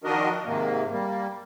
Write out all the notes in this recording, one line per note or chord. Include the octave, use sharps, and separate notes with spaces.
D#3 F3 D4 F#4 A#4 D#5
G#2 C3 D#3 A#3
G3 A#3